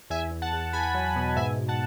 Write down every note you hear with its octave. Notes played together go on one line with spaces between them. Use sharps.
E2 E5 G#5
E2
F#5 A5
E2
E2 G#5 B5
F#3
B2
G#2 E5 G#5
G#2
F#5 A5